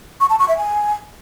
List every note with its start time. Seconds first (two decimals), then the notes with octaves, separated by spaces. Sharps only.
0.20 C#6
0.30 A5
0.39 C#6
0.48 E5
0.58 G#5